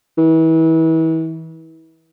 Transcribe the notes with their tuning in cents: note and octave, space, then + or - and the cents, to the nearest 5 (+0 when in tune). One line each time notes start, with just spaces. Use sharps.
E3 -35